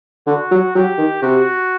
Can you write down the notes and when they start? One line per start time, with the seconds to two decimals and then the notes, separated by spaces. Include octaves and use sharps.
0.27 D3 F#4
0.51 F#3
0.75 F#3 G4
0.98 D#3
1.22 C3 F#4